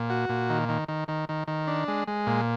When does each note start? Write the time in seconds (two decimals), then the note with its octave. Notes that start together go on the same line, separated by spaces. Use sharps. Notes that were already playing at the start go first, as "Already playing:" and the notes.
Already playing: A#2
0.10 F#4
0.29 A#2
0.50 D#3
0.69 D#3
0.88 D#3
1.08 D#3
1.29 D#3
1.48 D#3
1.67 D4
1.88 G#3
2.08 G#3
2.27 A#2